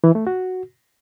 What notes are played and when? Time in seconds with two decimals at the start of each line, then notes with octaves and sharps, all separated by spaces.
0.04 E3
0.15 A3
0.27 F#4